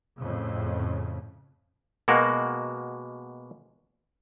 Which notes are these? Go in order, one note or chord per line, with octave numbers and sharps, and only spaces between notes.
F2 A2 C#3
B2 G#3 A#3 F#4 A#4